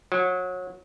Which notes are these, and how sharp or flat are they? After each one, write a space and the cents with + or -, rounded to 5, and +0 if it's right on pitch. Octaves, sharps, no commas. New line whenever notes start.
F#3 -25